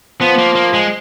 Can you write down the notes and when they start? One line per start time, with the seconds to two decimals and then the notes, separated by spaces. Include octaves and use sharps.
0.21 F3 B3
0.38 A#3
0.55 A#3
0.74 G#3